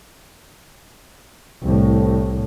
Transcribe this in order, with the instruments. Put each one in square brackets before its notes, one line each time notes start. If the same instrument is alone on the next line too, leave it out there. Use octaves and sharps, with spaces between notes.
[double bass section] C2 A2